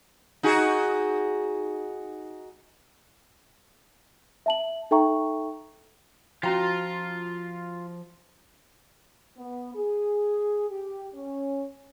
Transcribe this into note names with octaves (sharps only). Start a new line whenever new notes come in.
D#4 F#4 G#4
E5 A5 F#7
D#4 A4 E5 G5 A#5 C#6
F3 C#4 F4 F#4 F5 G5 A#5
B3
G#4
G4
C#4